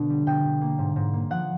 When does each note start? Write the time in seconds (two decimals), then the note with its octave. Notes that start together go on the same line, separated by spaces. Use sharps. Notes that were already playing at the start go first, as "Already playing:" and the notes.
Already playing: B2 D3
0.10 G3
0.26 B2 G5
0.44 B2
0.61 A#3
0.78 G#2
0.96 G#2
1.13 A#3
1.31 F3 F#5